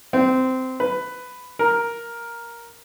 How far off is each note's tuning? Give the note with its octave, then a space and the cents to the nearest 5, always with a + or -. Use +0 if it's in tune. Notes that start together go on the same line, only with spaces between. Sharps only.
C4 -15
B4 +10
A#4 +5